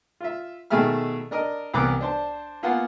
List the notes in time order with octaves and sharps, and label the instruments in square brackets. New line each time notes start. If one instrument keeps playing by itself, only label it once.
[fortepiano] F4 E5
B2 D#3 A3 G#4 E5 F6
D4 A#4 D#5
C2 E3 B3 A#4 D6 F#6
D4 C5 A5
A#3 B3 F4 F#5 G#5